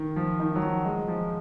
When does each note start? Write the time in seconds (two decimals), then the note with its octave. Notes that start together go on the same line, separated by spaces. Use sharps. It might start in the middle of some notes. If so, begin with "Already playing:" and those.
Already playing: D#3
0.16 F3
0.40 D#3
0.55 F#3
0.62 F3
0.85 G#3
1.08 F3